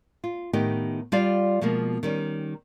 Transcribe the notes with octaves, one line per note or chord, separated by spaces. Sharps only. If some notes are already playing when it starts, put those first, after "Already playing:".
F4
A2 D#3 B3 D#4 G4
G3 F4 G4 D5 F5
B2 F3 G#3 A#3
D#3 G3 C#4